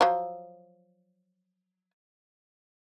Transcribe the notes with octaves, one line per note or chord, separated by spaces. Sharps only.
F3 F#3